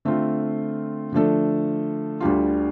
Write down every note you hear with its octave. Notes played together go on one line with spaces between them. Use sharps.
D3 A3 C4 F4
D3 F3 A3 D4 A4
D2 D3 G3 D4 F4